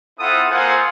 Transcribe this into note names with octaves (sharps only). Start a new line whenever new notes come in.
C4 E4 F4 A4 F#5 D#6
A#3 F4 G#4 A4 C5 F#5